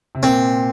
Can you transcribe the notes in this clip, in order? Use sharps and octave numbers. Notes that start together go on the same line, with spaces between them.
C3
A#2 C4